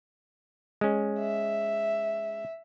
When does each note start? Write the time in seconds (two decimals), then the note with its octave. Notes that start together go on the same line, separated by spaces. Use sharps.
0.81 G#3 C#4
1.19 E5